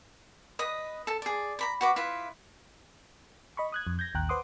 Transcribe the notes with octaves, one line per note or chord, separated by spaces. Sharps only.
B4 D#5 D#6
A4 A5
G#4 D5
A#5 B5 D6
F#4 B4 D6
E4 F4 B4
D#5 B5 C#6
D#6 F#6 G#6
F2
G6 G#6 A#6
A1 D#2 G5 A#5 F#6
B4 C5 F#5 C6 D6 D#6